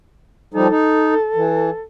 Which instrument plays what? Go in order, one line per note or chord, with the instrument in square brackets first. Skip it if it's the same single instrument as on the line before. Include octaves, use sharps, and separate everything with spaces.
[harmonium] F3 G3 D#4 [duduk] A4
[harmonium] D#4
E3